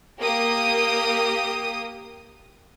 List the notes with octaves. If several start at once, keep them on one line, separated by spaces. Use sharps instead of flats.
A#3 G4 D#6